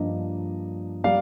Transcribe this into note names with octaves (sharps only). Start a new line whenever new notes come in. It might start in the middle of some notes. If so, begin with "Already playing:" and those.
Already playing: G2 F3 A#3 D4 D#5
G3 A#3 D5 F5